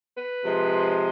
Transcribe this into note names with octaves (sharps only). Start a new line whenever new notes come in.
B4
C3 F3 G#3